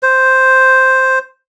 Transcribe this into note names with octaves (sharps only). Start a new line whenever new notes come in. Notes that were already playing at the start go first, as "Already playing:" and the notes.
C5